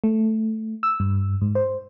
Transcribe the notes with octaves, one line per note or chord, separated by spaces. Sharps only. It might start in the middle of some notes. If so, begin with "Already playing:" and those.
A3
E6
G2
G#2
C5